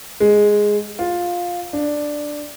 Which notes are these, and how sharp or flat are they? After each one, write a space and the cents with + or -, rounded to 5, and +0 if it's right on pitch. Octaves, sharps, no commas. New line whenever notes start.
G#3 +0
F4 +10
D4 +5